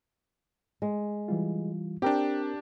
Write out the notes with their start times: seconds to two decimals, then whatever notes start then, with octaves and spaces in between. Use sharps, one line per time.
0.82 G#3
1.28 E3 G3 F4
2.02 C4 D4 G4 A#4 G5